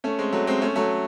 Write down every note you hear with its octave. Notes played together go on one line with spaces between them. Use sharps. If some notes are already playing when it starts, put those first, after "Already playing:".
A3 C#4
G#3 C4
F#3 A3
G#3 C4
A3 C#4
F#3 A3